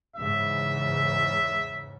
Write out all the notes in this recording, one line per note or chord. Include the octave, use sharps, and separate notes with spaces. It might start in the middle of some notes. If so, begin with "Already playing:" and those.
E2 G#2 C#3 E5